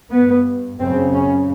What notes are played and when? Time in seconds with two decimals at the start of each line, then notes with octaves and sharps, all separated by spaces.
0.10 G2 B3
0.79 F#2 C#3 C4
1.13 C#4